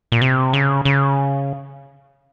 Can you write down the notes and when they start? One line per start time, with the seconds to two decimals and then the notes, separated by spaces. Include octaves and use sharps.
0.12 A#2
0.21 C3
0.53 C#3
0.85 C#3